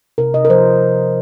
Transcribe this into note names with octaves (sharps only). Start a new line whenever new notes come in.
C3 A#4
C3 D#5
A#4
F3 C5